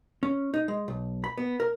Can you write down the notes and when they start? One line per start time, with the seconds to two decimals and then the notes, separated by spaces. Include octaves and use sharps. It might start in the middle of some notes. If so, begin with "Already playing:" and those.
0.23 C#4
0.54 D#4
0.68 G#3
0.88 B1
1.24 B5
1.38 B3
1.60 A#4